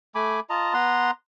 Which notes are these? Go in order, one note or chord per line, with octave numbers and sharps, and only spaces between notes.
A3 G#5 B5 D6
F4 D#5 A5 A#5
B3 B4 A#5 C6